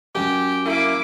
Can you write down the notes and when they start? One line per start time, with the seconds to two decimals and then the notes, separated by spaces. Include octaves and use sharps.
0.15 F#2 G4
0.65 A#3 E4 D6